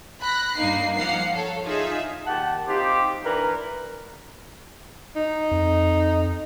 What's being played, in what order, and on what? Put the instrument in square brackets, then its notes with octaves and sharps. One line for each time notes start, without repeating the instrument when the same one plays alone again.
[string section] B5 F#6 A#6
G2 A#3 D#4 C7
F3 A#3 F5 F#5 C7
A4 C#5
D#4 F4 G#4 E5
[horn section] A#2 D#3 G4 F#5 A5
C4 D#4 F4 G4
E3 D4 A#4 B4 A#5
[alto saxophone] D#4
[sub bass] F2